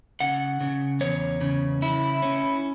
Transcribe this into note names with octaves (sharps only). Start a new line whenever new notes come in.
C#3 F#5
C#3
E2 C#5
C#3
E4
C#4